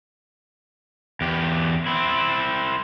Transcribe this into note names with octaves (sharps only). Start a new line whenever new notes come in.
E2 G4
C4 E4